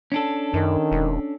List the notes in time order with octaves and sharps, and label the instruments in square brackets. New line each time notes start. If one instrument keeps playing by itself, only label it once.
[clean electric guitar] C#4 D4 A4
[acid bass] F#2 [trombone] D#3
[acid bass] E1